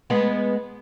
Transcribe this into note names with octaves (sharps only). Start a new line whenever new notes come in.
G#3 B3